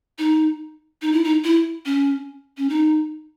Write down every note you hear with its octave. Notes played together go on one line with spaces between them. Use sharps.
D#4
D#4
E4
D#4
E4
C#4
C#4
D#4